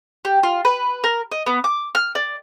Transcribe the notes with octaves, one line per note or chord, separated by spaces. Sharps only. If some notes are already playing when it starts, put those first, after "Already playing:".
G4
F4
B4
A#4
D#5
B3
D6
F6
D5